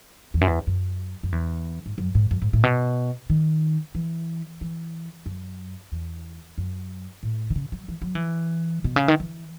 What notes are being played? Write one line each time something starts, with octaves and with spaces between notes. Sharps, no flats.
E2
F#2
E2
F#2
F#2
E2
G#2
F#2
G#2
F#2
G#2
A2
B2
D#3
E3
E3
F#2
E2
F#2
A2
D#3
C#3
F#3
E3
F#3
E3
B2
C#3
D#3
E3